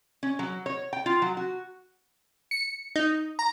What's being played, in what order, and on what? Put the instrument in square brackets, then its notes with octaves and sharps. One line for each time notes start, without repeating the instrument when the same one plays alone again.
[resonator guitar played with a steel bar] C#4
F#3
C#5
G5
F4
F#3
F#4
[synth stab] C#7
D#4
A#5